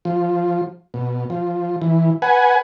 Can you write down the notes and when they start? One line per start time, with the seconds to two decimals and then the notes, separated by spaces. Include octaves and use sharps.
0.05 F3
0.94 B2
1.30 F3
1.81 E3
2.22 B4 F#5 G#5